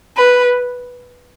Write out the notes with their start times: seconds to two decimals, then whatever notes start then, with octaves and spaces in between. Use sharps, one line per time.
0.17 B4